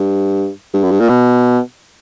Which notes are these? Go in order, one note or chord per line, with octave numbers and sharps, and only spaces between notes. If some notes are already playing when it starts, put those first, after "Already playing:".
Already playing: G2
G2
F#2
G2
A#2
B2